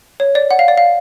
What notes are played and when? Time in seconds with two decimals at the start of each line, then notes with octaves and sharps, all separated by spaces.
0.20 C#5
0.35 D5
0.51 F#5
0.59 F5
0.68 D5
0.78 F5